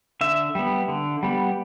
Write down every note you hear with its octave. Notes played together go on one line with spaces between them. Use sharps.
D3 E5
G3 B3
D3
G3 B3